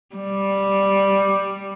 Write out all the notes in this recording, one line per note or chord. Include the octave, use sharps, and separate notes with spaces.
G3